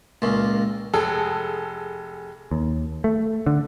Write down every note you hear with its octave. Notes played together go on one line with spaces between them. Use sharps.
C#2 A#2
F1 G#4 A4
D#2
A3
D3